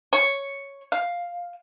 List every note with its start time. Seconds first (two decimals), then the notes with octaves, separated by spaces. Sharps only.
0.13 C#5
0.92 F5